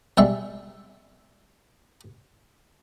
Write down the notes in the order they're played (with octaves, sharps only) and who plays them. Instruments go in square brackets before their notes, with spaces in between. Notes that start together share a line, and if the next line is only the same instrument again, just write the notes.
[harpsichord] B1 G3 G#3 E5 C6 C#6